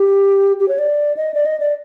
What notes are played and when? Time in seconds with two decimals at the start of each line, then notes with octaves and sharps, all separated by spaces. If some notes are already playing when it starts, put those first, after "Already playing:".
Already playing: G4
0.59 G4
0.68 C#5
0.78 D5
1.17 D#5
1.34 D5
1.45 D#5
1.60 D5